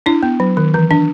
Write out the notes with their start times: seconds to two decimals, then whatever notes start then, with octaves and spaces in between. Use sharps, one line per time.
0.06 D4 E4
0.23 B3
0.40 F#3
0.57 D#3
0.74 E3
0.91 D4